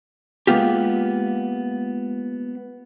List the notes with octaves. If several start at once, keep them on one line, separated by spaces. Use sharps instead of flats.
G#3 A#3 B3 F4 G4